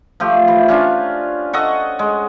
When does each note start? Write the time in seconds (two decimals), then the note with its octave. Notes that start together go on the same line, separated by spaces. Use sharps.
0.20 F3 A3 G4
0.48 E3
0.68 C#4 D4 F4
1.53 A4 D#5 F#5 C#6
1.99 G#3